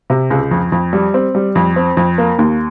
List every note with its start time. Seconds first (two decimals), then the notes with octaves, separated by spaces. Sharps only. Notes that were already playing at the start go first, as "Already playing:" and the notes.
0.10 C3
0.30 C#2
0.51 F2
0.72 F2
0.93 G3
1.14 C4
1.35 G3
1.55 F2
1.76 C4
1.97 F2
2.18 A#3
2.39 D#2